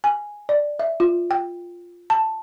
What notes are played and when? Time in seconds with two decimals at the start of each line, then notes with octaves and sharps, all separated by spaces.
0.04 G#5
0.49 D5
0.79 E5
1.00 F4
1.31 G5
2.10 A5